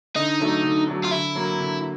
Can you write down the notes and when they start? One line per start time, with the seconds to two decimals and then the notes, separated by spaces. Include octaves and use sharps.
0.16 D3 D#4
0.40 F#3 A3 D4
0.64 D3
0.88 F#3 A3 D4
1.05 F4
1.12 D3 E4
1.35 F#3 A#3
1.60 D3